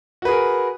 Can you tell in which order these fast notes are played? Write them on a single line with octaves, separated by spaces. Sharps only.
F#4 B4 G#4 A#4